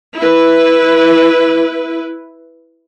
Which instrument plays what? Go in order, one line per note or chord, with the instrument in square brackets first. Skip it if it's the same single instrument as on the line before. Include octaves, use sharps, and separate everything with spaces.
[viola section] E4 B4